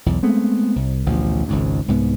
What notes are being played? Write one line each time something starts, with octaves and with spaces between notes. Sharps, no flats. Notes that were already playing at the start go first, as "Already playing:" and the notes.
B1 E2
G#3 A3 B3 C4
C2
A1 D2 B2 F3
G#1 C#2 G#2
C2 G#2 G#3 B3